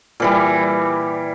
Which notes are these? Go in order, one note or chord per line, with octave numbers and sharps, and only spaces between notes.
A#2 E3 G3